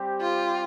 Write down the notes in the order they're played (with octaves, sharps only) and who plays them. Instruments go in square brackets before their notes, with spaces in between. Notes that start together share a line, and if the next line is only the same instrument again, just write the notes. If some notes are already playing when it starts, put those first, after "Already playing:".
Already playing: [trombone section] G3 C4 G4 C5
[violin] F4